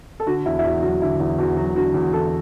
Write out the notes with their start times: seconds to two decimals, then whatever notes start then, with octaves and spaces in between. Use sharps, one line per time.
0.20 A4
0.26 D3 F#4
0.46 E2 E4
0.59 E4
0.64 E2 F#4
0.82 F#3 F#4
1.02 D3 E4
1.19 E2 E4
1.39 E2 F#4
1.57 F#3 F#4
1.76 D3 F#4
1.94 E2
2.13 E2 A4